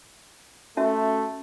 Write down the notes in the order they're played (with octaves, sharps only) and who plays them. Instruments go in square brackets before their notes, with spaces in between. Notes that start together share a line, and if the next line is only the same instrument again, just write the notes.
[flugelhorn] A3 [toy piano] C#4 F#4 E5